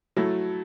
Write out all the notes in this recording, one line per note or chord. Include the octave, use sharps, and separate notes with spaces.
F#3 A3 E4 A4